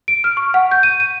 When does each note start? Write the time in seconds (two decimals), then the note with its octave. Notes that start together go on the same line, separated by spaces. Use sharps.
0.08 D7
0.24 F6
0.37 C#6
0.54 F#5
0.71 G6
0.83 D#7
1.00 D#7